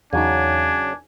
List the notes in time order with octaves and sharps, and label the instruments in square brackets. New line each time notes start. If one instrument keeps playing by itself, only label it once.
[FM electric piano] E2 D#4 [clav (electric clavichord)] C#3 F#3 [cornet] D4 [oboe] G#5